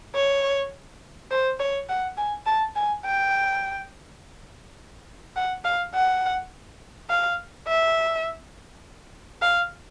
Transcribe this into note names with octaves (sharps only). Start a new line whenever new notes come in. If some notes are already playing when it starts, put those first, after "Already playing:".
C#5
C5
C#5
F#5
G#5
A5
G#5
G5
F#5
F5
F#5
F5
E5
F5